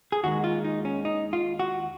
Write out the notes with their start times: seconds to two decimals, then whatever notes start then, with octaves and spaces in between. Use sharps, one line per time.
0.12 G#4
0.23 D#2 D#3 G#3 F#4
0.44 F4
0.65 D#4
0.85 C#4
1.05 D#4
1.33 F4
1.59 F#4